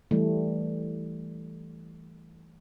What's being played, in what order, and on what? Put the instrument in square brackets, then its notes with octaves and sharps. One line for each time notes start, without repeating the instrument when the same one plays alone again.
[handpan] E3 G3 A3